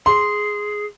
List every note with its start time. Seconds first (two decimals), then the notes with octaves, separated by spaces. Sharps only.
0.06 G#4 C6